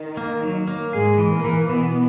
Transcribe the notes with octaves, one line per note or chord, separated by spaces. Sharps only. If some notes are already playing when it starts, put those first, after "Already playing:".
Already playing: D#3
A#3
F#3
A#3
G#2 G#3 G#4
E3
A#2 A#3
E3
B2 E3 B3